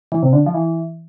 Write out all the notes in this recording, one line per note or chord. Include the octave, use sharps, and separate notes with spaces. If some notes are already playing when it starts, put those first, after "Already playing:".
E3
C3
D3
F3
E3